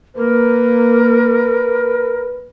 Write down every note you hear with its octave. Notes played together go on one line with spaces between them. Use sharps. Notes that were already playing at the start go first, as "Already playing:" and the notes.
A#3 A#4 B4